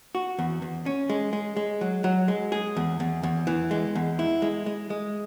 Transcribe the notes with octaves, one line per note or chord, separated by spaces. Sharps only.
F#4
E2
E2
C#4
G#3
G#3
G#3
F#3
F#3
G#3
G#4
E2
E2
E2
E3
G#3
E2
E4
G#3
G#3
G#3